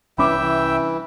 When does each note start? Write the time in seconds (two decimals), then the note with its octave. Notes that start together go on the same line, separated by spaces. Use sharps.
0.18 C2 E3 C#4 D4 E5 G5 B5 D6
0.41 E3